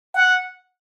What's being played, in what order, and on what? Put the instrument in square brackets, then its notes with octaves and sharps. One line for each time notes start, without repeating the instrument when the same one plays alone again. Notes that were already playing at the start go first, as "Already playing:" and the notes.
[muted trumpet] F#5